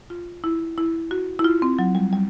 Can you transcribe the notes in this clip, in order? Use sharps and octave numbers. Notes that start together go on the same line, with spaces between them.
F4
E4
E4
F#4
E4
F4
C4
F#3
G3
G3